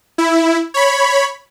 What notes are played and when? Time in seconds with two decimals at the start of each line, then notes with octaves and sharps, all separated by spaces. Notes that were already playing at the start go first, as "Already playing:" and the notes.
0.18 E4
0.74 C#5 B5